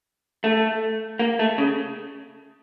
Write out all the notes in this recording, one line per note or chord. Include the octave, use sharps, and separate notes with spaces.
A3
A#3
A3
C#3